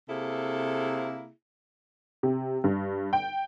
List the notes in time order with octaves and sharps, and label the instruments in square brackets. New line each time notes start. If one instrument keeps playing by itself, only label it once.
[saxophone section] C3 A#3 E4 G#4 A4
[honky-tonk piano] C3
G2
G5